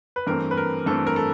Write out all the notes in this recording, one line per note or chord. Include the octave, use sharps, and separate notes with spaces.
B4
G2 E3 A3 C4 A#4
B4
A#4
G2 E3 A3 C4 A4
A#4
A4